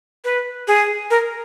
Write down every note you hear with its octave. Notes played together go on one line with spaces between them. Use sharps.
B4
G#4
A#4